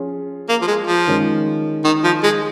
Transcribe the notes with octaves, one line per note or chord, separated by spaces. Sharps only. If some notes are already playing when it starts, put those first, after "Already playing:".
Already playing: F3 C#4 F4 G#4
A#3
F3
G#3
F3
D#3 G#3 C#4
D#3
F3
G#3